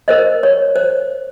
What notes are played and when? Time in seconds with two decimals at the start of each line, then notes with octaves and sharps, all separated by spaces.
0.08 A#4 C5 D#5
0.43 C#5
0.76 C5